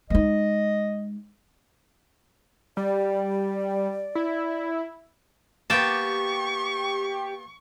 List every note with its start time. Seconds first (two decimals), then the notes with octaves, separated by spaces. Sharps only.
0.10 G#3 D#4 D#5
2.77 G3 D5
4.15 E4
5.70 A#3 B3 G4 G5 A5 C#6